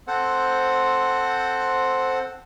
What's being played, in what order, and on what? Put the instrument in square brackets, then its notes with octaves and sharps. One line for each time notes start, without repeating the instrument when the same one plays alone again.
[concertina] C4 A4 C5 F#5